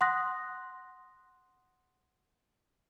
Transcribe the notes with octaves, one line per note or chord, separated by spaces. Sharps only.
F#5 C6 D#6 F#6 A#6